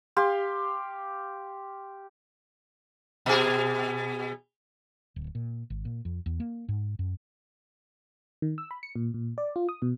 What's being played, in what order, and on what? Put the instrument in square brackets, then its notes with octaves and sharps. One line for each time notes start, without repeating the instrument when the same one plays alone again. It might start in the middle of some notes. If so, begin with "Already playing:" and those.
[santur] G4 F5 C6
[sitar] B2 G#4
[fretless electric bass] D1
A#2
G#1
A#2
F2
E2
A#3
G#2
F#2
[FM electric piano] D#3
E6
B5
C#7
A#2
A#2
D5
F4
D#6
B2